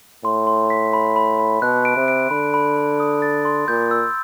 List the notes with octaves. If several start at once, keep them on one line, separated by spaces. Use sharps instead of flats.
A2 C6
C6
B6
B5
B5
B5
B2 F#6
D7
C3
D7
D3 B5
B5
B5
D#6
A6
C6
A#2 G6
E6